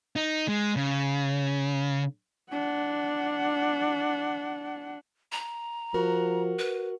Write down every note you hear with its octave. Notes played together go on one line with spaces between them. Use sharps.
D#4
G#3
C#3
D4 F#5
A#5
F3 F#4 A#4
B4